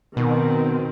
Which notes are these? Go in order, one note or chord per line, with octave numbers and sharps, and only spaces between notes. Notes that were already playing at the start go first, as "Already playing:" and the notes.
B2 D#3 C4